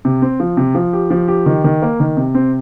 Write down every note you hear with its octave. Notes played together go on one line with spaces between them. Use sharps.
C3
C4
F3
C3
F3
G4
F3
G4
D#3
D#3
A#3
D#3
C3
C4